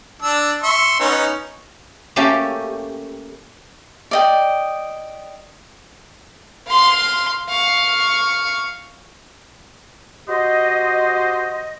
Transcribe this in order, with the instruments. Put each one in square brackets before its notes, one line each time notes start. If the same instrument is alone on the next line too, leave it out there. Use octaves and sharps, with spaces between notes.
[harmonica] D4 E6
E5 C6 C#6
B3 C#4 D#4
[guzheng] A3 A#3 C#4 G4 A4
[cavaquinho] D5 D#5 G5
[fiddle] F5 C6
F5 C#6
[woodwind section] F#4 G4 C5 D#5